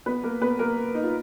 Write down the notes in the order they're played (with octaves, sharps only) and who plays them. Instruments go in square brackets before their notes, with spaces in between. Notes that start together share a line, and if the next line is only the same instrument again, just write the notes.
[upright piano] B3 B4
A#3 A#4
B3 B4
A#3 A#4
D#4
F4